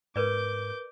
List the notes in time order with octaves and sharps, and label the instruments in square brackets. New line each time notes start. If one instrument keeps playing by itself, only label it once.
[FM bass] G#2 [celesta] A#4 B4 D5 [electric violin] D6 G6